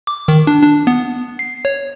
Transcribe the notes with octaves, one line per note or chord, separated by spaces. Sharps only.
D6
D#3
D4
D4
B3
C7
C#5